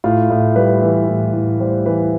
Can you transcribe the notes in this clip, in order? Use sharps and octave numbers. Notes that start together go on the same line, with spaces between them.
A2 F4
A2
G3 B4
E3
A2
A2
G3 C5
E3 B4